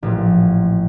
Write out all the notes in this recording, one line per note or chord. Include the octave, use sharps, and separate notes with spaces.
A1 A#2 F3 F#3